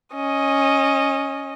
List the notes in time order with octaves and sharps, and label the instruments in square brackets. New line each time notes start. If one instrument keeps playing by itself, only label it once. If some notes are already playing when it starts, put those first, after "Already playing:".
[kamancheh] C#4 D#5